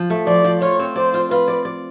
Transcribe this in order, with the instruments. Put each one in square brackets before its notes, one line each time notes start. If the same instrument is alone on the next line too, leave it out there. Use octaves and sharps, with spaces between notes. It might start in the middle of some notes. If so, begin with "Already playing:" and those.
Already playing: [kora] F3
A3
[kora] F3 [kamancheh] D5
[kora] F3
[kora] F4 [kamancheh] C#5
[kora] C4
[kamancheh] C5 [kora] D5
[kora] F4
[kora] F4 [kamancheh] B4
[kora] D5
D5